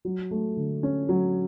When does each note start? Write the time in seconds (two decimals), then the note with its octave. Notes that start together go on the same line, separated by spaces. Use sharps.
0.05 F#3
0.31 A3
0.57 D3
0.83 C#4
1.09 F#3